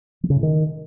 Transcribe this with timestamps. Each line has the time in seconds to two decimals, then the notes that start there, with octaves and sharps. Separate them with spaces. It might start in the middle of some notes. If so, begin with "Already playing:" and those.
0.23 F3
0.30 C#3
0.36 A2
0.43 D#3